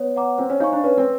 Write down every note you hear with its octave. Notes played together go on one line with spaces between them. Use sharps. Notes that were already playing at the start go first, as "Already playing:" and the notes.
Already playing: B3 C#5
F#5 A#5 D6
C4 C5
C#4
D#4 F5 G#5 C#6
D4
C#4 B4
C4